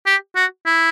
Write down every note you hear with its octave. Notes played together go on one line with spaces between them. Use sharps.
G4
F#4
E4